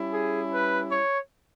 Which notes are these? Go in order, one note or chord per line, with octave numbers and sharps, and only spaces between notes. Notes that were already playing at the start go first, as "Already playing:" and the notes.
Already playing: G3 C#4 E4
G#4
B4
C#5